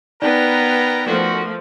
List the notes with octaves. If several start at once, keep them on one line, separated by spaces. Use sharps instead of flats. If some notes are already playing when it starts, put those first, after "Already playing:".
B3 D#4 A#4 B4 D5 G5 A#5
F3 A3 F#4 A#4